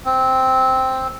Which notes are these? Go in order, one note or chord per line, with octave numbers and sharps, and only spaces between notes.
C4